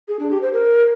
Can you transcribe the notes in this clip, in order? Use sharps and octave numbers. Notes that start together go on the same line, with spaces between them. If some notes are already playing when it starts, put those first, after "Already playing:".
G#4
D4
G4
C5
A#4